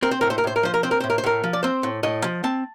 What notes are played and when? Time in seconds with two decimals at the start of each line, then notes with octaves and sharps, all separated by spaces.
0.03 C4 A#4
0.11 C5
0.21 A2 A#4
0.30 C5
0.38 A#4
0.44 A2 C5
0.56 A#4
0.63 F3 C5
0.74 A#4
0.83 C4 C5
0.91 A#4
1.00 A2 C5
1.10 A#4
1.18 C5
1.24 A2 A#4
1.44 F3
1.53 D5
1.63 C4 C5
1.83 A2
2.03 A2 D#5
2.24 F3
2.44 C4 A5